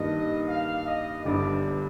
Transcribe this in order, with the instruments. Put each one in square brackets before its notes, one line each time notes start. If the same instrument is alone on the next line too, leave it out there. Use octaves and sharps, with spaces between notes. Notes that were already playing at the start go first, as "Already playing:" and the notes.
Already playing: [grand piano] G2 D#3 A#3 D4 [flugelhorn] D#5
[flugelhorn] F5
D#5
[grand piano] G1 G2 D3 [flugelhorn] D5